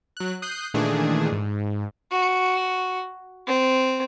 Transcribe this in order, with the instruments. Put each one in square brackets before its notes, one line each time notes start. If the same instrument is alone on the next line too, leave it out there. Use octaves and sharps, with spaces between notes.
[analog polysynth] F#3 F#6
D#6 F#6 G6 C7
A#2 D#3 E3 A3 D4 G#4
G#2
[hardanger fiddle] F#4
C4